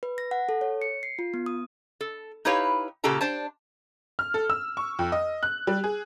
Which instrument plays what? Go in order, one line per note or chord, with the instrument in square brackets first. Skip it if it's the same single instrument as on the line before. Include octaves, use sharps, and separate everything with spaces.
[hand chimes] B4
A#6
F#5
A4
C#5
C#7
C7
F4
B3
D#6
[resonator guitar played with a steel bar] A4
D#4 E4 G4 B4 C#5 F5
A#2 C#3 A#3 G4 A4 A#5
D4 C5 A5
[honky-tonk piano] F6
A4
E6
C#6
F2
D#5
F#6
G3
G#4